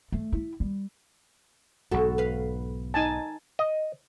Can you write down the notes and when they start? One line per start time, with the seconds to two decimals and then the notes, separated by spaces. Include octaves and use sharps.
0.12 A3
0.33 E4
0.60 G3
1.92 B1 G#2 F#4 A4
2.18 B4 F5
2.94 D#4 G#5 A5
3.59 D#5